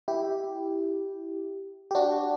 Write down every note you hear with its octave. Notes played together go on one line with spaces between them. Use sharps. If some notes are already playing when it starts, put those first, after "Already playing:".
E4 G4
G4
D4 F#4